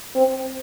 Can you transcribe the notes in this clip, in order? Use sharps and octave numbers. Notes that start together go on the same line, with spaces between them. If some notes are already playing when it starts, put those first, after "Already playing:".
C4